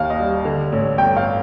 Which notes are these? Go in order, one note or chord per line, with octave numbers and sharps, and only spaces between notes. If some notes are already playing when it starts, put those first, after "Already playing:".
Already playing: D#2 F5
D#5
G3
D3
A1
G1 G5
F5